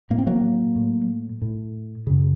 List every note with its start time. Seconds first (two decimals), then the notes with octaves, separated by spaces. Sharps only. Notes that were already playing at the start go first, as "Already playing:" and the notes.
0.10 A2 A#3
0.19 C4
0.27 F#3 A#3
0.76 A2
1.42 A2
2.07 F#2 C#3